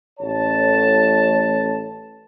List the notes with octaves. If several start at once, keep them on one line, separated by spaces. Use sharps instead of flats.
A1 C#5 A5